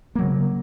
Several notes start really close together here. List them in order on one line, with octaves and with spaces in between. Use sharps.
A#3 F#3 C#3